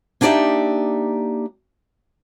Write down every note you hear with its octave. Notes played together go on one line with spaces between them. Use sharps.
A#3 D4 D#4 G4 D5 E5